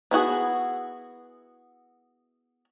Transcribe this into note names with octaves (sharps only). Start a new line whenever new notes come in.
B3 E4 F#4 G#4